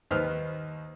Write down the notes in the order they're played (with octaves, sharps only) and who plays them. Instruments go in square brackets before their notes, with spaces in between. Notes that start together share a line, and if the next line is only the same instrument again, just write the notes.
[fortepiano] D#2 D#3 B4 C5 F6